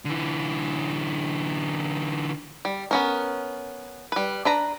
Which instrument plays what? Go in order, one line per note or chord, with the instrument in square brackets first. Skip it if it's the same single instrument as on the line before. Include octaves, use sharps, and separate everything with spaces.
[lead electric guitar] D3 E3
[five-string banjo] G3
B3 C#4 A#4
G3 B4
D4 B4 A#5